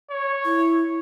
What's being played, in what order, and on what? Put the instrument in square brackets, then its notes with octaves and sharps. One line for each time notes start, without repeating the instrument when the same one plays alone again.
[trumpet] C#5
[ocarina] E4